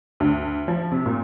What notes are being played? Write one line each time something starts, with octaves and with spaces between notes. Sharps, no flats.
D2
F3
C3
A#2